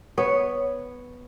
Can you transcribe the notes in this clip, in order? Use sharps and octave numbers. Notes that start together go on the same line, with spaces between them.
B3 C#5